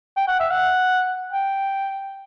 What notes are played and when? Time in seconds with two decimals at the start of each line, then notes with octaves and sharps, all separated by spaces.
0.17 G5
0.28 F#5
0.40 E5
0.51 F#5
1.33 G5